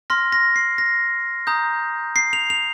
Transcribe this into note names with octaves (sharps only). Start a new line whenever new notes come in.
C6 F6 A#6
A#6
C7
A#6
A#5 D#6 G6
C7
F7
F7